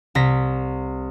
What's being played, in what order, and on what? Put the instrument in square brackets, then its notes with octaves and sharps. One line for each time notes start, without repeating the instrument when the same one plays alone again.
[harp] C2 A#6 B6